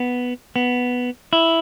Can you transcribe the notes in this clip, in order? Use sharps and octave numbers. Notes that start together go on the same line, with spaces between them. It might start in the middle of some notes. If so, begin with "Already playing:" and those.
Already playing: B3
B3
E4